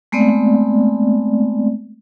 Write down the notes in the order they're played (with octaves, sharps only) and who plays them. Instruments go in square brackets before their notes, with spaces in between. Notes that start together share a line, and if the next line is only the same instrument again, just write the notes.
[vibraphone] G#3 A3 B3 C4 D5